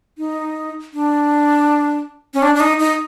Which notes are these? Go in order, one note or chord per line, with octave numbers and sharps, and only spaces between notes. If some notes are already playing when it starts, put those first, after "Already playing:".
D#4
D4
C#4
D4
D4
D#4
D#4